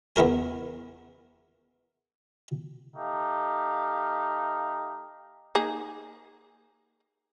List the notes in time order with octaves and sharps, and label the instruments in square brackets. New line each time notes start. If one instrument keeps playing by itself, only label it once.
[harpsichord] E2 B3 E4 A#4 G#5
[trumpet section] A3 D#4 G4 F5
[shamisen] A#3 D#4 G#4